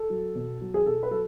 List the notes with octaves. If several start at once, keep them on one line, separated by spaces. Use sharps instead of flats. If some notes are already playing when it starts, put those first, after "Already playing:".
Already playing: A4
F#3
B2
F#3
G#4
B2 A4
B4
F#3 A4